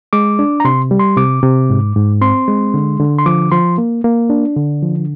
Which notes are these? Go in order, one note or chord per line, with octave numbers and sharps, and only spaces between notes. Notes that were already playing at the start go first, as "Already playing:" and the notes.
G#3 D6
D4
A#5
C3 C6
G3
C6
C3 D6
C3
G#2
G#2
C4 C6
G#3
D3
D3
C6
F3 D6
F3 C6
A#3
A#3
D4
D3
F3